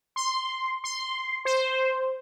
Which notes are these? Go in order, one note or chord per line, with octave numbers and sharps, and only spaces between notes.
C6
C6
C5